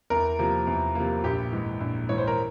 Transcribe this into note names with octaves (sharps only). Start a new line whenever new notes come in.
E2 A#4
C3 F3 A#3
E2
C3 F3 A#3
A#1 G4
G#2 E3
A#1
G#2 E3 C#5
C5
A#4